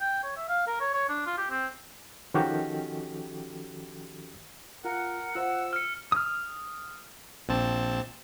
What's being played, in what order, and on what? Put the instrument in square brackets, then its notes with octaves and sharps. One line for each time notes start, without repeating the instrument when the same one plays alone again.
[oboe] G5
C#5
E5
F5
A#4
C#5
C#5
D4
F4
G4
C4
[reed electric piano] D#3 F3 C#4 F#4 G4 A4
[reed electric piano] F4 [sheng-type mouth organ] A#4 [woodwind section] F#5
[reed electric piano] F4 C5 [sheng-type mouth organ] E6
[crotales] F6 C#7
[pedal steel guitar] D#6 F6
[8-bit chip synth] A#1 C4 A5